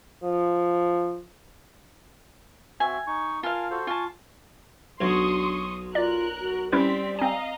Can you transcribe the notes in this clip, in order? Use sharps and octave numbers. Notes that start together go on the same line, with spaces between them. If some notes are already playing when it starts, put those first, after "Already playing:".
F3
C4 F#4 E5 G#5
D#4 C#6
F4 A#4 F5 G#5 A5
F#4 A4 C5
F4 G#5 A5 C#6
B1 F#3 D4 C#5 C6 C#6 D#6
F4 A#4 D5 F#6
F#4
G3 C4 C#4 E4 B4 D5 B6
C4 D#5 F5 G#5 A#5